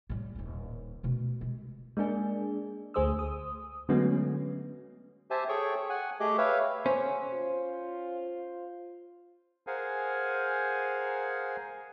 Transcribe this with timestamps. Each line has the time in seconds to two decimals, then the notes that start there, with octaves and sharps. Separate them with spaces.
0.10 A2 G3
0.35 D#1 G#1
1.03 B2 A3
1.41 G#3
1.97 G#3 A#3 D4 G#4
2.94 D2 A3 G#4 C5 D#6 E6
3.19 D#6
3.89 D3 F#3 G#3 A3 B3 C#4
5.30 G4 C5 E5 G#5 A5
5.49 G#4 A4 C#5 G5 C#6
5.90 F#5 G#5
6.20 A3 G4 G#4 D#5 D6
6.38 B4 C#5 E5 F5
6.86 C#3 C#4 C5
7.33 F4
9.67 G#4 A#4 C5 F5 F#5 G#5